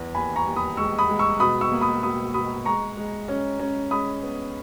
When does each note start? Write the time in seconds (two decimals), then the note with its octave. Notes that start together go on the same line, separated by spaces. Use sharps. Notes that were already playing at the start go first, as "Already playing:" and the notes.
Already playing: E2
0.15 D#2 G#5 B5
0.36 A#5 C#6
0.46 D#2
0.56 B5 D#6
0.77 G#3 C#6 E6
0.98 B5 D#6
1.09 G#3
1.19 C#6 E6
1.40 B2 B5 D#6
1.61 C#6 E6
1.72 A#3
1.81 B5 D#6
2.02 B2 B5 D#6
2.34 B2 B5 D#6
2.65 G#3 A#5 C#6
2.97 G#3
3.28 C#4
3.59 C#4
3.91 G#3 B5 D#6
4.23 B3